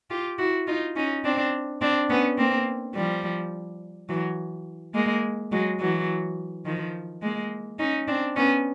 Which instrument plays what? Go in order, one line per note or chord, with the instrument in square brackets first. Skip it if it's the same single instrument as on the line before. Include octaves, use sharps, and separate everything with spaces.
[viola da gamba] F4 G4
E4 F#4
D#4 F4
C#4 D#4
C4 D4
C4 D4
B3 C#4
A#3 C4
F3 G3
E3 F#3
G#3 A#3
F#3 G#3
E3 F#3
D#3 F3
G#3 A#3
C#4 D#4
C4 D4
B3 C#4